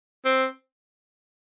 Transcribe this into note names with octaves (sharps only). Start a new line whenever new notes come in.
C4